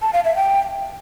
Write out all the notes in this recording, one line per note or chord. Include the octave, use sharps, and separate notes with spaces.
A5
F5
E5
G5